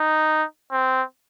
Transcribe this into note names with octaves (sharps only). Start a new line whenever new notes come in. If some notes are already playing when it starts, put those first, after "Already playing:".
Already playing: D#4
C4